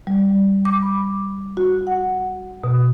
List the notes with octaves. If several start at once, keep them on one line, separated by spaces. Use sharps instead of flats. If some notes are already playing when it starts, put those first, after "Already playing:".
G3
D6
B5
F#4
F#5
B2